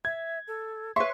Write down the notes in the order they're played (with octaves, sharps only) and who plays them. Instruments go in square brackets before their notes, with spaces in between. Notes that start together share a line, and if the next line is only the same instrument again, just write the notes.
[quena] E5 [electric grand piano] G#6
[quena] A4
[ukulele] B4 E5 [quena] C#5 [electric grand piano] C6 C#6